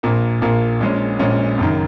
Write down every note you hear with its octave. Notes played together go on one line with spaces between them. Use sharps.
A#1 A#2 A#3
A#1 A#2 A#3
A#1 A#2 G#3 C#4
A#1 A#2 G#3 C#4
F#1 F#2 D#3